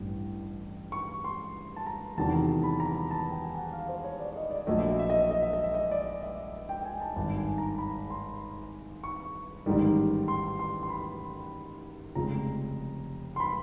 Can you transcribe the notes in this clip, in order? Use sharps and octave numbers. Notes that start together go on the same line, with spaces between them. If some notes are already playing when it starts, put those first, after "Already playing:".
Already playing: A1 G2 E3
C#6
C6
A5
A#5
E2 C3 D#3 F#3 A5
A#5
A#5
B5
A#5
A5
G5
G#5
F#5
F5
C5
C#5
D5
D#5
D5
A#1 A#2 F#3 A3 D#5
E5
D#5
E5
D#5
E5
D#5
E5
D#5
E5
D#5
D5
E5
G5
G#5
A5
G#1 G2 D#3 A5
G#5
A#5
B5
C6
C#6
A1 G#2 D#3 G3
C6
C6
C6
B5
F1 F2 C#3 F3 G#3 A#5
C6
B5